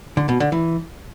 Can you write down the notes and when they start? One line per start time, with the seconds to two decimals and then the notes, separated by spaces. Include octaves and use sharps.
0.17 D3
0.29 B2
0.40 D3
0.52 E3